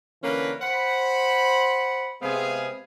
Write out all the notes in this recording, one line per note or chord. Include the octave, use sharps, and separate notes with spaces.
D3 E3 A#3 C#4 A#4 B4
C5 F#5 B5
C3 G#3 B3 C4 G#4 F5